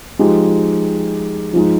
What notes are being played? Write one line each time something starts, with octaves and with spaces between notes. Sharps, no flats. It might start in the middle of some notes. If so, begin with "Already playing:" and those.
F3 G#3 D#4 G4
F3 G#3 D#4